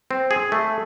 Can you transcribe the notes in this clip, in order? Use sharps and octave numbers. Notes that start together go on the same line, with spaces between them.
C4
G#4
A3